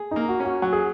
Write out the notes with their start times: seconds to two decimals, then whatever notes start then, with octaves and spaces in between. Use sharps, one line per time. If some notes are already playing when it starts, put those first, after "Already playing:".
Already playing: G#4
0.11 A#3 D#4
0.28 F#4
0.40 C#4 F#4
0.62 F#3 F#4
0.73 G#4